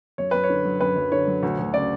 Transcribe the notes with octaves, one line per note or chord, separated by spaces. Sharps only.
F#2 C#5
F#2 B4
C#5
D3
F#3
F#2 B4
F#2
D3 C#5
F#3
D2
D2
C#3 D5